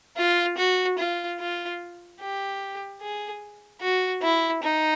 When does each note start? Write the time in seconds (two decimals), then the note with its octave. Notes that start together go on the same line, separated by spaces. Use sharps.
0.17 F4
0.57 F#4
0.98 F4
1.39 F4
2.20 G4
3.01 G#4
3.81 F#4
4.22 E4
4.62 D#4